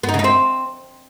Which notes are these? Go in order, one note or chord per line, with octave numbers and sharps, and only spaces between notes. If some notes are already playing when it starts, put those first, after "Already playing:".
B3
D#4
C#3
D#4
C4